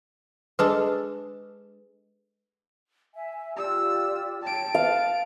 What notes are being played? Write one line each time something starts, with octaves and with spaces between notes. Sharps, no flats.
G#3 D4 A4 B4
E5 G#5
F4 G4 D5 E6
C#5 G5 A5 D7
B4 F5